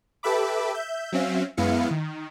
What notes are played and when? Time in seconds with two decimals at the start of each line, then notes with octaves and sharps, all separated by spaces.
0.23 G4 A4 B4 E5 B5 D6
0.74 E5 G6
1.12 F#3 C4 C#4 E5 F5
1.57 F#2 G#3 B3 E4 F5 C#7
1.91 D#3